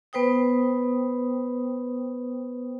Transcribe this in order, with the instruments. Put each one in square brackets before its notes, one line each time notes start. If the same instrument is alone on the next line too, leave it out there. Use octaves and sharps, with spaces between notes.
[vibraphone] B3 B4 C5 G5 D#6